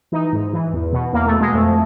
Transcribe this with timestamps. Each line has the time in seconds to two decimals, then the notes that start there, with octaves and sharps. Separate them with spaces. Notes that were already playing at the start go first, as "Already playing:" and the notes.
0.12 E3 D#4
0.33 G#2
0.53 E3
0.73 E2
0.93 B2
1.13 E2 A#3
1.26 A3
1.33 B2
1.40 G#3
1.54 F2 A3